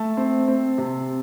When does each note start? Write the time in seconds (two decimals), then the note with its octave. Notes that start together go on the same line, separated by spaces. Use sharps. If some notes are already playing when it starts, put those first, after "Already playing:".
Already playing: A3 A5
0.17 C4
0.48 C4
0.78 C3